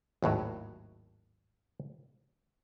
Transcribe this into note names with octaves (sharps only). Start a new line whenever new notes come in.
G#1 D#2 A2 F#3